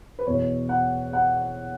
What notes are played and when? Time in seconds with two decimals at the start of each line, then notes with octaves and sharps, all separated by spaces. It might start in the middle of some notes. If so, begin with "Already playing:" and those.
0.19 B4
0.27 E2 B2 C#5
0.69 F#5
1.13 F#5